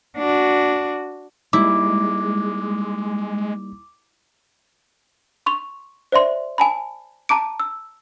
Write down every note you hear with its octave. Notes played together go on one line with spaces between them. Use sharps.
D4 F#4
G3 G#3 A#3 D#4 E4 D6
C6 C#6 F7
C5 D5 E5 C6
G#5 A5 B5
A5 A#5 D6 D7
E6